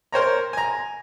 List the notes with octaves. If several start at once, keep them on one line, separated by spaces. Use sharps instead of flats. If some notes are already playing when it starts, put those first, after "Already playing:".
A#4 C5 C#5 A#5
G#5 A#5